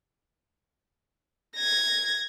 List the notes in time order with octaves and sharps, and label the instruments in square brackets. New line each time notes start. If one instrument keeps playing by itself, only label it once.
[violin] G#6 A#6